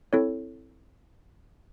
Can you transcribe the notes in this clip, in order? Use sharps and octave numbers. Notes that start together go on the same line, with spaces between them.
C4 E4 A4 C#5